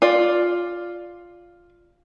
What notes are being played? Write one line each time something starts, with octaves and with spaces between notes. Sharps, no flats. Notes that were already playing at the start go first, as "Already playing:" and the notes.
F4 D5